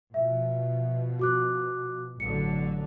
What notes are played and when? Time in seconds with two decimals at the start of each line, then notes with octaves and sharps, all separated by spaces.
0.14 B2 F3 E5
1.19 F#4 D6 F#6
2.20 A1 D3 F#3 C#7